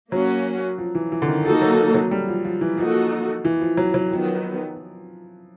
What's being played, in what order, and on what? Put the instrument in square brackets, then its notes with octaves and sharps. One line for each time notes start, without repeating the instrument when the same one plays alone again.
[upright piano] F#3 [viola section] A#3 C#4 F#4
[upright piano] F3
E3
E3
D3
D#3
[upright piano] F3 [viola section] A#3 D#4 F#4 A4
[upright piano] F#3
F#3
G3
F3
F3
E3
[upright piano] F3 [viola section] A#3 D#4 F#4 A4
[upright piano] E3
F3
F#3
F#3
[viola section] D#3 F#3 B3 [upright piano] F3